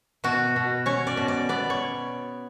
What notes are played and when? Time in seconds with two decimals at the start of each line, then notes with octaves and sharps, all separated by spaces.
0.24 B2 F#4
0.56 B2
0.86 C#4 C#5
1.07 D5
1.17 B2
1.28 D5
1.49 B3 D5
1.70 C#5